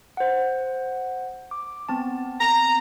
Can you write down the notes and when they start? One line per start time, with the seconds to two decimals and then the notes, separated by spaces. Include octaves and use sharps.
0.17 C5 F#5
1.51 D6
1.89 B3 C4 A5
2.41 A#5